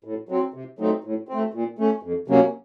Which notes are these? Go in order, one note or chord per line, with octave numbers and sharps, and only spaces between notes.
A2
F#3 C4
C3
F#3 A3 C4 D#4
A2
A3 C4
A#2
A3 C#4
F2
C3 F#3 A#3 C#4